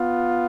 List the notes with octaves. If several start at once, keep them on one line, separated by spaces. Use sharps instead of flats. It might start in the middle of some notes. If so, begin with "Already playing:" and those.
Already playing: B3 F4